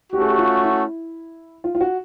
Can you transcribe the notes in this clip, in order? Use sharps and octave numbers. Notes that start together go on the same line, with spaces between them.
A3 C#4 F#4 G4
G#4
G4
F4
E4
F4
F4
F#4